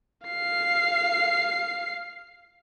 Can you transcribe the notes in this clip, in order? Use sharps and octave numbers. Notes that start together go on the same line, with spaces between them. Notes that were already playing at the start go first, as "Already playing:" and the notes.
F5 C7